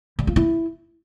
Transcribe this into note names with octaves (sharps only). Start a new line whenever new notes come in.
G3
F4
E4